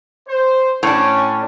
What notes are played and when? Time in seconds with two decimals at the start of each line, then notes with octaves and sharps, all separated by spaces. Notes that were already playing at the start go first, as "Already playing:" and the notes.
0.28 C5
0.83 A2 C#4 D4